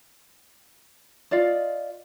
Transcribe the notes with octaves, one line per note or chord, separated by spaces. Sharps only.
F4 D5 D#5